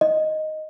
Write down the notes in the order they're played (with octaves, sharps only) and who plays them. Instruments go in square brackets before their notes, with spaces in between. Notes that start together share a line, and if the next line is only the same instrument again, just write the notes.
[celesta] D#5